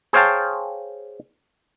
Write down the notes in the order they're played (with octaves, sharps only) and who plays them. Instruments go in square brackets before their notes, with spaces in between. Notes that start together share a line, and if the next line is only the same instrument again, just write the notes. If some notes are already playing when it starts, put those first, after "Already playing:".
[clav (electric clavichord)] G#4 C5 C#5 F5 G5 A5